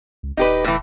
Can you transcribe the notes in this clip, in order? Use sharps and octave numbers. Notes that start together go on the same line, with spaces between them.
C#2
D#1 D#4 G4 B4
A2 E3